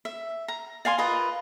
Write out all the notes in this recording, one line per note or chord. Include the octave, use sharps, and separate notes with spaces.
E5
A#5
D5 F5 G#5 C6
F4 A#4 B4 D#5